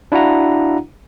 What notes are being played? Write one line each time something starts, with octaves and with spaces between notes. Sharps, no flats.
D4 E4 F#4 F5 F#5 A#5